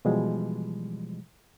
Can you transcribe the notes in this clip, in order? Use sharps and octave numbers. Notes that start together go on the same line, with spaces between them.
B2 E3 F3 G3 G#3